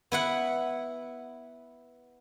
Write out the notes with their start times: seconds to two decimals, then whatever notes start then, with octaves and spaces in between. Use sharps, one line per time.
0.12 B3 E4 F#5